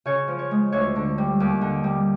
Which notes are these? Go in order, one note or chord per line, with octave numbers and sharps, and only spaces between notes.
C#3 C#5
F3
C#5
G#3
D2 C#5
D3
G3
D#2
D3
G3